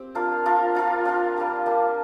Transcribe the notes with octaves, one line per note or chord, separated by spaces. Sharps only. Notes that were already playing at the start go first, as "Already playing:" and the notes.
Already playing: C4 G4
D4 F4 A#4 F5
D4 F4 A#4 F5
D4 F4 A#4 F5
D4 F4 A#4 F5
G3 A#3 D4 G4
G3 A#3 D4 G4